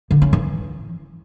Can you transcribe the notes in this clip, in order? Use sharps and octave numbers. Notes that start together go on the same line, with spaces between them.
D3
C#4
E3